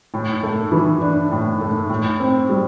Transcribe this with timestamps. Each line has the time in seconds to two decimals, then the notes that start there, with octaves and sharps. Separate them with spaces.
0.14 A2
0.43 A3
0.72 E3
1.01 D4
1.32 A2
1.61 A3
1.90 A2
2.20 C4
2.49 G3